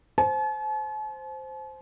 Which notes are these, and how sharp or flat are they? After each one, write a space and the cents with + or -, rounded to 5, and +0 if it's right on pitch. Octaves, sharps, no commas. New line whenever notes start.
C5 +0 A5 -45